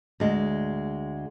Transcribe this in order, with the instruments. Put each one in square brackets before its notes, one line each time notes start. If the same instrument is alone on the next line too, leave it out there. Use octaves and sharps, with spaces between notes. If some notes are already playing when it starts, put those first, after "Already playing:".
[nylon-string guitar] D2 G#3